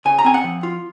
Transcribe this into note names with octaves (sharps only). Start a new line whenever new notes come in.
C#3 G#5
A#5
C4 G#5
F#5
F3
F4